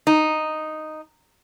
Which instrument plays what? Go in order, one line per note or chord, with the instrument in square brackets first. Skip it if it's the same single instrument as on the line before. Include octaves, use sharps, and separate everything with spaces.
[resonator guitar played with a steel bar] D#4